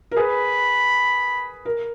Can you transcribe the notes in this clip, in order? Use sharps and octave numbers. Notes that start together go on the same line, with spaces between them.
A#4
G#4 B4 B5
A#4